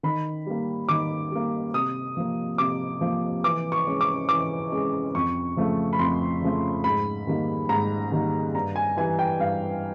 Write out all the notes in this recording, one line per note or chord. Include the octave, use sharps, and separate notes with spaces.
D#3 B5
G3 A#3
D#3 D6
G3 A#3
C3 D#6
F3 A#3
C3 D6
F3 A#3
E3 D6
C#6
G#3 C#4
D6
E3 D6
G#3 C#4
F2 C#6
C#3 F3 A3
B5
F2 C6
C#3 F3 A3
G#2 B5
D#3 G3 A#3
G#2 A#5
D#3 G3 A#3
G2 A#5
G#5
E3 G3 G#5
G5
G2 F5